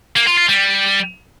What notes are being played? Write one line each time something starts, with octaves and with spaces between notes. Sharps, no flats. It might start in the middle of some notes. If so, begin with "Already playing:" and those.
A#3
F4
F4
G3